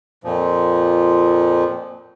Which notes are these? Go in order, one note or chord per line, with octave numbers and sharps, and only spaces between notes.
F2 A#2 F3